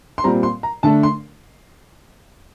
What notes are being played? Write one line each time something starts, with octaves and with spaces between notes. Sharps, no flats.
C6
A#2 G3 C4 A#5
C6
A#5
D3 A3 D4 A5
C6